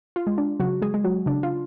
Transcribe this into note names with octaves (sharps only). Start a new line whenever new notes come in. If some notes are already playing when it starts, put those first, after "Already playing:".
F4
G#3
D4
C#3 F#3 F#4
G#3 G#4
G#3
F#3 F#4
C#3 D4
F4